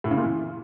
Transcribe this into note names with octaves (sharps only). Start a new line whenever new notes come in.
A2
C#3
A#2
E3